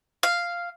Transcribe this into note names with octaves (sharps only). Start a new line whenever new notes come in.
F5